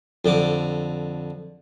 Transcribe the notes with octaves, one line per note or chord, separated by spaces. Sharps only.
F2 D3 D6